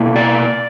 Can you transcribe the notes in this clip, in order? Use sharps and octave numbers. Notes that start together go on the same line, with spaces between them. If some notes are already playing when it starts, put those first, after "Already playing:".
Already playing: B2 A#3 E4
D5